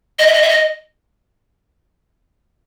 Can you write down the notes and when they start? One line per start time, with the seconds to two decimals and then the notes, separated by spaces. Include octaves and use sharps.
0.19 D#5
0.27 E5
0.34 D#5
0.42 E5
0.49 D#5